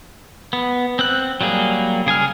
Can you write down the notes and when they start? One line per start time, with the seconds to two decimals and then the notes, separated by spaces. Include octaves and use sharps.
0.53 B3
0.99 C4 F#6
1.41 F#3 G3 A#3 G#4
2.06 C#3 G#4 G#5 F6